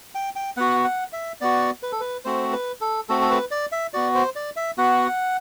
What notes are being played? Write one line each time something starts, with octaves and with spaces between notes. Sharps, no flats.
G5
G5
B3 F#4 F#5
F#5
E5
B3 F#4 D5
B4
A4
B4
A3 C4 F#4 C5
B4
A4
A3 C4 F#4 A4
A4
B4
D5
E5
B3 F#4 D5
C5
D5
E5
B3 F#4 F#5